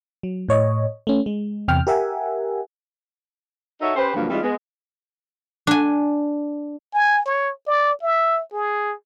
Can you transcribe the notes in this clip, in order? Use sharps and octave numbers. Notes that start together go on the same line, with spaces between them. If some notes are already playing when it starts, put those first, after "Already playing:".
F#3
A2 C#5 D#5
A3 C#4
G#3
E2 C3 G5 F6
G4 A#4 E5 F#5 G#5
D#4 F#4 A4 C#5 E5
C#4 G4 B4 C5
D2 G2 F3 F#3 A#3
E3 G3 G#3 C4 D#4 F4
G#3 B3
D4 G#5
G#5
C#5
D5
E5
G#4